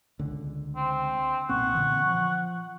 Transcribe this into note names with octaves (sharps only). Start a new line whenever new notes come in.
C#2 D3
C4
B1 A#2 C4 F#5 C#6
A#2 D3 E3
F3